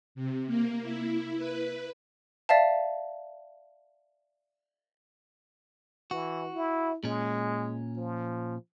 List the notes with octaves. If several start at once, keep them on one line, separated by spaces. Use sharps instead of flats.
C3
A#3
E4
B4
D5 E5 F5 A5
E3 F#4
E4
A#2 G#3 C#4
F3